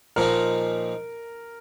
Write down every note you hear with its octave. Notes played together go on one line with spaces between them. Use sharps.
A#2 F3 D#4 A#4